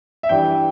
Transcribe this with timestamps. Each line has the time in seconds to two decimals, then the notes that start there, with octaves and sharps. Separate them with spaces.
0.23 E5
0.29 G2 E3 G3 G5